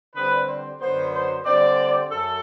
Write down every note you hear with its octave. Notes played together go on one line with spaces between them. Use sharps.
D3 G3 C4 B4
C5
F#2 D3 F#3 B3 C5
C5
D3 G3 C4 D5
F#2 A4